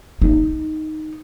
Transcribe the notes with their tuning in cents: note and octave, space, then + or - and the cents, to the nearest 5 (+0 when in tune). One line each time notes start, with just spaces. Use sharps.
D#4 +0